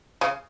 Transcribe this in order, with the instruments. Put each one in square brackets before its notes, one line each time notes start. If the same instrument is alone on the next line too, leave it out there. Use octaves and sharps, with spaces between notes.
[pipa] C#3